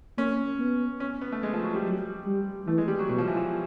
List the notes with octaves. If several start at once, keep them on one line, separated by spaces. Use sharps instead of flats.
A#3 C#4
B3
C#4
B3
A3
G#3
F3
F#3
G3
F#3
G3
E3 A3
G#3
G3
F#3
B2 F#3
F3
E3
F3